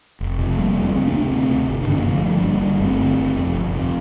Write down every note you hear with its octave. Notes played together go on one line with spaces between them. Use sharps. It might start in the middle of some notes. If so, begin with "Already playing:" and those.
F1
F2 C3
A3
F1 G3 A#3
F2 C3
D2 A3 C4
A#3 D4
C3
A3 C4
D2 A3 C4
C3
G1
D4
G2 D3 C4
A#3
G1 F3 A3
G2 D3
G1 G3 A#3
G2 D3
G1 A3 C4
G2 D3
G1
F2 C3
G1
F2 C3